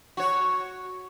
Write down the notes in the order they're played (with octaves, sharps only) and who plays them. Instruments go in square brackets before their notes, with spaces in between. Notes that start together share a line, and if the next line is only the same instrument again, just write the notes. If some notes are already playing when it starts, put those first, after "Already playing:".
[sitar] F#4 C#5